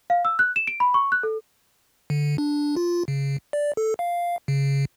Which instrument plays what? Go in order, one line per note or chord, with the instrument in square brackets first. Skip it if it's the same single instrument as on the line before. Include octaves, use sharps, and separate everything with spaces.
[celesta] F5
E6
F#6
E7
D7
B5
C#6
F#6
A4
[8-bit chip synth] D3
D4
F4
C#3
D5
A4
F5
C#3